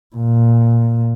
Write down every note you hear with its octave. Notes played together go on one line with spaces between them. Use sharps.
A#2